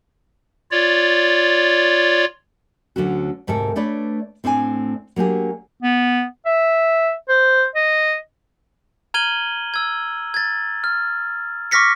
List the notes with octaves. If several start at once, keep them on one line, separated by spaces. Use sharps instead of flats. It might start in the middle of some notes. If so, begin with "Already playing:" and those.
F4 C#5 D5
D2 D3 F#3 C#4 F#4
D2 G#2 C3 A4 A#4
A3 D4 B4 C#5 D5
A2 C4 D4 C5 G#5
F#3 A#3 D4 G4 G#4
B3
E5
C5
D#5
A#5 F6 G#6 D#7 F#7 G7
E6 G#6
G#6 A6
F6
C#6 D6 F6 A#6 B6 C#7